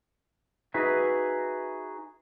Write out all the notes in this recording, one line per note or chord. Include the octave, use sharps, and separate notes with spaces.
D#4 F#4 G#4 B4 E5